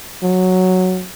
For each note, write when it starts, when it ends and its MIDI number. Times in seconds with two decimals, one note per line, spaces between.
0.23 1.05 54